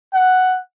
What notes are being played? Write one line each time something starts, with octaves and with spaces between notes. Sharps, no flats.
F#5